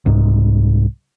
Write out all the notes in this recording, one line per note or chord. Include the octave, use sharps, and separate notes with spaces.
C2 G#2